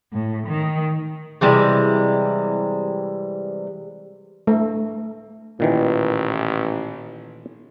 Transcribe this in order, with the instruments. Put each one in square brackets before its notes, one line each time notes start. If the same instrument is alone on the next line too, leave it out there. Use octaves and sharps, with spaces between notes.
[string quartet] A2
D#3
[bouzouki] C3 E3 G3 G#3
[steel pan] A3
[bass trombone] A1 [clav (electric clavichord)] A#2 D#3 E3